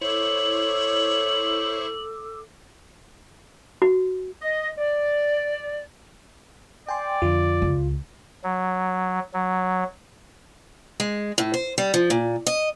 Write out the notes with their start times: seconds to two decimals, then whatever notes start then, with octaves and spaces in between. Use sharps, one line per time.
0.01 E4 A4 C5 C#5 C#6 D6 E6 F#7
3.82 F#4
4.42 D#5
4.78 D5
6.89 D5 G5 G#5 C6
7.22 F2 D3 F3 F4
7.62 C#2
8.44 F#3
9.34 F#3
11.00 G#3
11.38 A2
11.54 C5
11.78 G3
11.94 F3
12.10 A#2
12.47 D#5